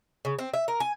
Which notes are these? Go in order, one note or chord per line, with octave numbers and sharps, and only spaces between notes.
C#3
C4
E5
A#4
G#5